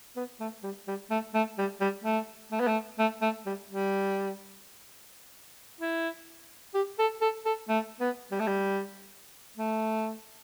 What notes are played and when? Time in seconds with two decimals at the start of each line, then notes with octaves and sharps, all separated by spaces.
0.16 B3
0.40 A3
0.63 G3
0.87 G3
1.10 A3
1.34 A3
1.58 G3
1.81 G3
2.04 A3
2.52 A3
2.60 B3
2.67 A3
2.99 A3
3.22 A3
3.46 G3
3.69 G3
5.80 E4
6.74 G4
6.99 A4
7.21 A4
7.45 A4
7.69 A3
8.00 B3
8.31 G3
8.39 A3
8.47 G3
9.57 A3